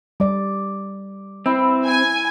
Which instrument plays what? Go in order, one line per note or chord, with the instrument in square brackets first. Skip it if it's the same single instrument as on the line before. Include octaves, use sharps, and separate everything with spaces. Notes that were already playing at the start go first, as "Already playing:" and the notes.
[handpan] G3 D5 [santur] D6
[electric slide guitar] C4 [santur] E4 B4 E5
[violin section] G#5